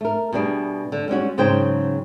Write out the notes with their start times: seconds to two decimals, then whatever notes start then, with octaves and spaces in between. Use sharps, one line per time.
0.01 A3 A#4
0.33 B2 G3 D4 G#4
0.92 D3
1.08 G3 G#3 C#4 F#4
1.38 G#2 C#3 F#3 C5 G5